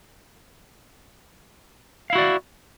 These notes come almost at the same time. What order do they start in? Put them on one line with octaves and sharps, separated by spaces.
F5 E4 F#4 D5